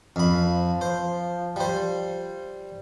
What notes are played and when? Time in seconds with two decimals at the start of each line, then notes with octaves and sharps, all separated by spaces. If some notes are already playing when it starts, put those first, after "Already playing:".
0.16 F2 F3 B5
0.81 C5
1.56 G3 C5